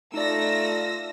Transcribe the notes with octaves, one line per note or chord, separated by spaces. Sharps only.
A3 D#4 F4 D5 E6 A#6